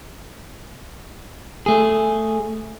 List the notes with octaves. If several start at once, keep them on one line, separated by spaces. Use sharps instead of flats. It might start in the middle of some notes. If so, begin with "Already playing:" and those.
A3 G#4